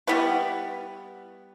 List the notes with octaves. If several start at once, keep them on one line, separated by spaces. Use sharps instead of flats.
G3 B3 E4 B4